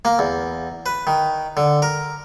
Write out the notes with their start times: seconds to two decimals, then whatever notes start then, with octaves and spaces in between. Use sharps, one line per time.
0.05 A#3
0.19 E2
0.86 B4
1.07 D#3
1.57 D3
1.82 A#4